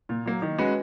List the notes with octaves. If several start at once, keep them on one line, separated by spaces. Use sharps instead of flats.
A#2
F#3 A#3
D#3
G#3 C#4 F#4 B4